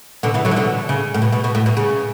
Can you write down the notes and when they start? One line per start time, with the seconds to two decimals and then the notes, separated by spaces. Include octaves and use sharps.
0.23 B2 D3
0.34 C#3 E3
0.45 D3 F#3
0.51 E3
0.56 B2 D3
0.89 C#3
1.14 A2
1.22 B2
1.32 B2
1.44 B2
1.55 A2
1.66 B2
1.77 C#3